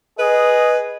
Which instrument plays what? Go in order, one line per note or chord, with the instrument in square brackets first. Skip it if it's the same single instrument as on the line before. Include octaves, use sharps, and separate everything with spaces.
[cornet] G#4 [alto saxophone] B4 [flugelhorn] D#5